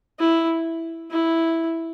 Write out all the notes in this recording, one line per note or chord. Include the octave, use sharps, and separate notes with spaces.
E4
E4